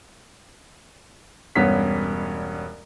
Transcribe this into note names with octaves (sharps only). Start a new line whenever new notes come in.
E1 G2 B3 C#4 B6